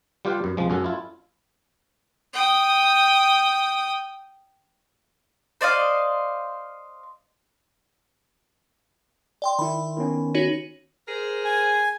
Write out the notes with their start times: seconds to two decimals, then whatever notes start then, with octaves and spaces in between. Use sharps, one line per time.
0.25 G3 F4 G4 B4 F5 G5
0.44 F#2
0.57 C2 F3 G#3
0.70 F#2 C#4 F#4 A4
0.84 E4 F4
2.33 G5 D#6
5.61 C5 D5 D#5 F5
9.42 D5 G5 C6
9.59 D#3 E4 B5
9.97 D#3 B3 C#4
10.35 D#4 F#4 C#5
11.08 G#4 A#4 C5
11.45 G#5